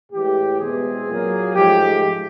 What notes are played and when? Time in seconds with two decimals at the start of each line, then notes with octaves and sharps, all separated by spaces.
0.12 A2 E3 G#3 G4
0.60 E2 B2 G#3 C4 G#4
1.08 A#2 F#3 A#3
1.55 G#2 F3 A3 G4